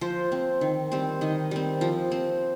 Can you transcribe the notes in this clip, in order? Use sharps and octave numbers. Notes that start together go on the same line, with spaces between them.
F3 C5
C4
D#3
G3 C4
D#3 D#5
G3 C4
F3
C4